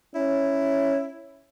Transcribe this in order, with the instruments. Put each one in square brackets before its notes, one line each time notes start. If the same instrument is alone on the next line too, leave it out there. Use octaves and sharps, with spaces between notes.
[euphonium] C#4 [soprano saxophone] E4